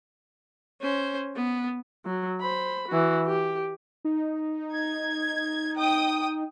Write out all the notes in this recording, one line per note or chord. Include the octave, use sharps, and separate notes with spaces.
C#4 C5
B3
F#3
C5 B5
E3 F#4
G4
D#4
G#6
G5 D#6